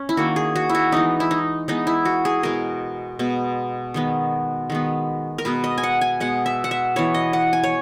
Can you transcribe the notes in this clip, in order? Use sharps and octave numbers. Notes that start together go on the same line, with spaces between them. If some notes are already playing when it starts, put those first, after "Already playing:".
Already playing: C#4
E4
D#3 A#3 F#4
G#4
F#4
E4
F#4
E3 G#3 B3 D#4
E4
D#4
E3 G#3 B3 D#4
E4
F#4
G#4
B2 G#3 B3 A#4
B2 G#3 B3
D#3 G#3 B3
D#3 G#3 B3
A#4
B2 G#3 B3 B4
D#5
G#5
F#5
G#5
B2 G#3 B3 F#5
E5
F#5
E5
E3 B3 C#5
D#5
F#5
G#5
C#5